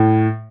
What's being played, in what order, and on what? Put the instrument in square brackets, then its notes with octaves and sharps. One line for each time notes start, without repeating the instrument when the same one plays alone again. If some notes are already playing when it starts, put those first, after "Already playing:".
Already playing: [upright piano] A2